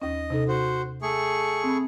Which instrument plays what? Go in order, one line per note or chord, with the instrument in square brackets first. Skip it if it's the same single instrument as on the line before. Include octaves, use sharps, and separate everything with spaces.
[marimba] D#2 C#4 [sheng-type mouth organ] D#5
[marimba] C3 D#4 A4
[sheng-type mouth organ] F#4 C5
A3 G#4 C#6
[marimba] C4 B5